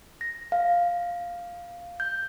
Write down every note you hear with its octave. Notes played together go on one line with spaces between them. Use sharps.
A#6
F5
G6